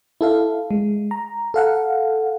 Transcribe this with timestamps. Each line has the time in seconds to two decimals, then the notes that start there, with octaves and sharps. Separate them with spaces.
0.21 E4 A4 F5
0.71 G#3
1.11 A#5
1.54 A4 F5 F#5